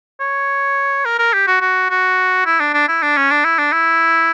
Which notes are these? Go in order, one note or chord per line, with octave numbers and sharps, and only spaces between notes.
C#5
A#4
A#4
G4
F#4
F#4
F#4
E4
D4
D4
E4
D4
C#4
D4
E4
D4
E4